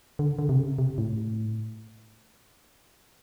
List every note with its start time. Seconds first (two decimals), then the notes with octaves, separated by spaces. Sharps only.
0.19 D3
0.39 D3
0.49 C3
0.59 C#3
0.78 C3
0.98 A2